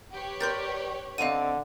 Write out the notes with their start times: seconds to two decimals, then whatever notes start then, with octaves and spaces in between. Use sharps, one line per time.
0.12 G4 B4 C#5
0.41 A#4 D5 C6 G6 A6
1.18 D3 C4 D#4 D5 F5 D#7